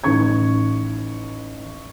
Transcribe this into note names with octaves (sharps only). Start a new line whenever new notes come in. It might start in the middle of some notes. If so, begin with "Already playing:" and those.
A1 D#4 C#6 G#6